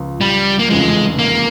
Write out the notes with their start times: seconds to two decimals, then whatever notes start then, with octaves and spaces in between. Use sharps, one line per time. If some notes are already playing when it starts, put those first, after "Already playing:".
Already playing: C#2 C#3 F3
0.21 G3
0.59 A#3
0.70 F1 E2 C#3 F3 G#3
1.19 A#3